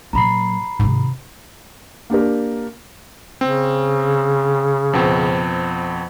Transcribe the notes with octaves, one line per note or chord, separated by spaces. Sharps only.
A#2 F#3 A#5 B5 C7
G#2 C3 D#3
A#3 D4 G4 A#4
C#3 C4
F2 B2 C4